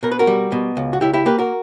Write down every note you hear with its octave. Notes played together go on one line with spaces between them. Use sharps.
B2 A#4
B4
F#4 A#4
G3
B2
C#2
F#4
C#2 E4 G4
E4 G4
A#3 G4 B4
F#4 A#4